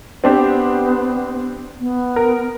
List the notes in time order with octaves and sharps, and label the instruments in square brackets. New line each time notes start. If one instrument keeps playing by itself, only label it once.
[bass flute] B3 [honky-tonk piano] C4 D4 G4
[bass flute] B3
[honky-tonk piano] A#4